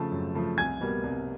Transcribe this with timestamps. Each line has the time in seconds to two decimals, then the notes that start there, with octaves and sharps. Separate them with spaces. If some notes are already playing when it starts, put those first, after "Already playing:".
Already playing: C#3 F3 A3 A5
0.12 F#2
0.35 C#3 F3 A3
0.58 C2 G#5 G#6
0.81 B2 G3 A#3
1.04 C2